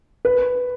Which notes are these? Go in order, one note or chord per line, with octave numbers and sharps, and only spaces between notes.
B4